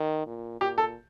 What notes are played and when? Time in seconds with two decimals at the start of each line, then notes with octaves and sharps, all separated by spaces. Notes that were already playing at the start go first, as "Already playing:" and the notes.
Already playing: D#3
0.26 A#2
0.61 A#2 G4
0.78 A4